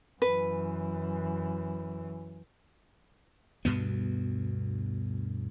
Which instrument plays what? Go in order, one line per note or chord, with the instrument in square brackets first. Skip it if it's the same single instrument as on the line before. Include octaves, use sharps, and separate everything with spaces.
[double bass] F#2 E3 [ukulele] B4
[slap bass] D2 G2 B2 B3